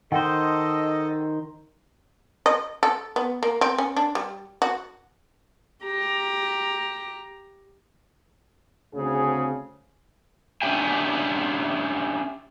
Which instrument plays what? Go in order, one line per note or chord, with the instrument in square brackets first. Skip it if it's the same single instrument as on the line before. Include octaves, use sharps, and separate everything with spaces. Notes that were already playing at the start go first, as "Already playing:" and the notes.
[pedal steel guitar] D#3 C5 [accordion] A4 D#5 [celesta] F#5 G5
[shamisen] D#5
A4
B3
A#3
C4
C#4
D4
G3
F#4
[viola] G4 A#5
[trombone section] D2 C#3 C4 G#4
[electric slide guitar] C#4 D4 G4 E5 G5 G#5